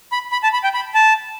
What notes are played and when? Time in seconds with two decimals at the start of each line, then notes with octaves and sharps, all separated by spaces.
0.12 B5
0.32 B5
0.43 A5
0.53 B5
0.64 G5
0.74 B5
0.95 A5